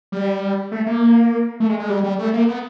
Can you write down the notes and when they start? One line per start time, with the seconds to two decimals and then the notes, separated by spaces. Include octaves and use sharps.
0.12 G3
0.72 A3
0.86 A#3
1.60 A3
1.69 G#3
1.79 G#3
1.89 G3
2.04 G3
2.19 A3
2.33 A#3
2.48 B3